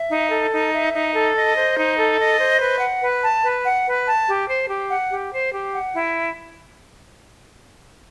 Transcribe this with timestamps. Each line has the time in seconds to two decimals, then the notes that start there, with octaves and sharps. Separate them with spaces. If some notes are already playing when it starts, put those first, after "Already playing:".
Already playing: E5
0.10 D#4
0.30 A4
0.51 D#4
0.72 E5
0.93 D#4
1.14 A4
1.35 D#5
1.56 C5
1.77 D#4
1.97 A4
2.18 D#5
2.39 C5
2.60 B4
2.81 F#5
3.02 B4
3.23 A5
3.44 B4
3.65 F#5
3.86 B4
4.06 A5
4.27 G4
4.48 C5
4.69 G4
4.90 F#5
5.10 G4
5.31 C5
5.52 G4
5.73 F#5
5.94 E4